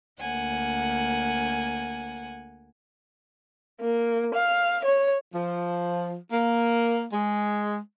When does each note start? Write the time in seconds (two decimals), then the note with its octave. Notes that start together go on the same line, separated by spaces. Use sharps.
0.21 D2 A#3 F#5 G#5
3.80 A#3
4.34 F5
4.85 C#5
5.33 F3
6.31 A#3
7.12 G#3